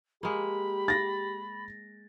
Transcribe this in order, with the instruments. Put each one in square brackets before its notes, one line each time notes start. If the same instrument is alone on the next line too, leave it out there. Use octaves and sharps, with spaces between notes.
[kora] G#3 A#3 [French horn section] G4 [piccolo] B5
[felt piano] A6 A#6